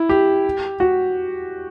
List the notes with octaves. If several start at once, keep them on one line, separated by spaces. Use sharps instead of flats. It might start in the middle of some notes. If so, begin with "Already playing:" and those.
Already playing: E4
G4
F#4